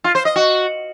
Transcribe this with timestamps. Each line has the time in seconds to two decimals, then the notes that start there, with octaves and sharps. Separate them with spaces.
0.04 F4
0.15 C5
0.25 D#5
0.36 F#4